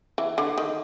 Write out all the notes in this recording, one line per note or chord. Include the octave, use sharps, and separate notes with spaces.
E3
D3
D#3